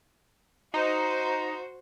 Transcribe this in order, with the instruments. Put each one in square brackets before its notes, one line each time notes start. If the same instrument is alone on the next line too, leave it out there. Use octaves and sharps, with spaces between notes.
[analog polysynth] D#4 [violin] F#4 C5